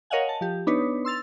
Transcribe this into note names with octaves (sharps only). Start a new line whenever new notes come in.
A#4 C#5 D#5 F5 F#5 G#5
A5
F3 G4
B3 D4 D#4 B4 C#5
C6 E6 A6 F7